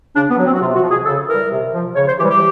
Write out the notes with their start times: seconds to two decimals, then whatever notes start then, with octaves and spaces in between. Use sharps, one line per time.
0.15 C#3 D4
0.30 B3
0.37 F#3
0.45 C4
0.53 F#4
0.60 C3 F4
0.75 F#4
0.82 F3
0.90 G#4
1.05 C#3 A4
1.28 E3 G3 A#4
1.50 C3
1.73 F3
1.95 C#3 C#5
2.07 C5
2.18 E3 G3 G4
2.30 G4